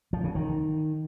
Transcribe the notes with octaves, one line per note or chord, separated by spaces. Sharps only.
F3
C#3
D#3